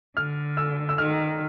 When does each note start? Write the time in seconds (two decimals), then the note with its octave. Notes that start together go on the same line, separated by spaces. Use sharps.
0.16 D3 F6
0.57 E6
0.89 E6
0.98 D#3 F6